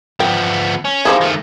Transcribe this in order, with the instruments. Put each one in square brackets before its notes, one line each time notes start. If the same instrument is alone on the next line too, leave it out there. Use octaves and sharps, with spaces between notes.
[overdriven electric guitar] F3 B3 [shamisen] G5
[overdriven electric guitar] C#4
[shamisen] F3 G3 G#4 [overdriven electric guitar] D#4 E4
[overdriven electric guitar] D#3 A3